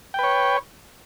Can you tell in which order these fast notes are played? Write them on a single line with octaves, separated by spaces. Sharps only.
G5 B4 C#5